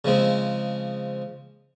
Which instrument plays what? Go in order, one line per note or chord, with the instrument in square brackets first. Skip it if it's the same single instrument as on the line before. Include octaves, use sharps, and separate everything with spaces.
[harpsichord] C#3 F3 G#3 C4